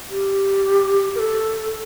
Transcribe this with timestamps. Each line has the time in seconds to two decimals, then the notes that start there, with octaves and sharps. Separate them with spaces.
0.10 G4
1.15 A#4
1.19 A4